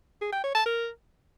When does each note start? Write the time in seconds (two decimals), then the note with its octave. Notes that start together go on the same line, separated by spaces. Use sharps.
0.21 G#4
0.32 G5
0.43 C#5
0.55 A5
0.66 A#4